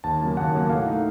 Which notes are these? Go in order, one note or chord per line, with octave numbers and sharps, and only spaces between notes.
D#2 A5
C#3 F#3 A#3
D#2 F#5
C#3 F#3 A#3
A2 F5
A3 D#4